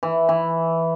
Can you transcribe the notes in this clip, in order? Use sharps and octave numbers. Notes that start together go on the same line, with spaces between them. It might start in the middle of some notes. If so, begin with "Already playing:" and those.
E3
E3